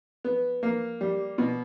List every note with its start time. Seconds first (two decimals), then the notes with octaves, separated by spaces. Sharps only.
0.24 B3
0.63 A#3
1.01 G3
1.38 B2